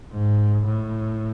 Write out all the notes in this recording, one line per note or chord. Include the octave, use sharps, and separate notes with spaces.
G#2
A2